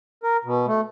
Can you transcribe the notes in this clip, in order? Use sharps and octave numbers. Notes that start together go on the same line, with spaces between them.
A#4
B2
A3